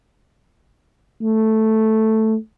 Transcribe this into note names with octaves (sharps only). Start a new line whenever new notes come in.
A3